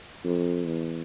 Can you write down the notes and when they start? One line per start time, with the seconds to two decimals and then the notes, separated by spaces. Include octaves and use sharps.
0.24 F2
0.66 E2